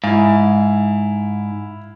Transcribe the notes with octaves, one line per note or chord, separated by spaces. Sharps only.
G#2 E4 F5